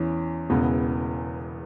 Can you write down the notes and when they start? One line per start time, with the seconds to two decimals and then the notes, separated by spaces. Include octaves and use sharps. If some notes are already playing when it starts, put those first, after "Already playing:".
Already playing: E2 E3 C#4
0.50 E1 E2 C#3 E3 B3